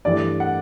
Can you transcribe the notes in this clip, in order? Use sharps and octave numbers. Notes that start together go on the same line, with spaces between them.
G2 E3 A3 D5
F#5